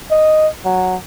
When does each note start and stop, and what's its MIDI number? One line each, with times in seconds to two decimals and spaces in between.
0.11 0.48 75
0.65 0.97 54